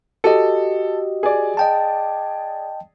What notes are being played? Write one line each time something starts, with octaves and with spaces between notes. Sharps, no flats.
F#4 G4 A4 D#5
G#4 D5
D#5 G5 A5